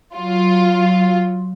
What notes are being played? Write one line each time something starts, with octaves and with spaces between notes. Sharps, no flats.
F#3 F4